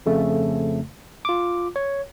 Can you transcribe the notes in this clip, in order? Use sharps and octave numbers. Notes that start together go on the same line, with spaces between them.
F2 C#3 A3
F4 D6
C#5